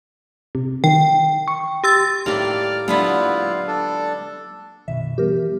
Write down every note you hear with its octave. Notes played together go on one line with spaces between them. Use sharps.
C3
D#3 G5
C#6
G4 E6 A6
A2 A#3 D#4 G4 D5 F6
D3 F#3 G#3 A#3 B3 E4 F4 B4
D4 A4
F#2 B2 D#3 E5
E3 G3 B3 G4 A#4